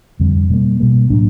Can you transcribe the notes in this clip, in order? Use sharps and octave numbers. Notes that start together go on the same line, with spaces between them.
F2 D3 G3 C4
B2 G3 A#3
B2 G3 A#3
A2 F#3 A#3 D4